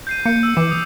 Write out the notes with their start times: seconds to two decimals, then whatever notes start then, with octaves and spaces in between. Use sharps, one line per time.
0.07 G6 C7 D#7
0.25 A#3 G6 C#7
0.43 E6
0.57 E3 D6
0.71 D#6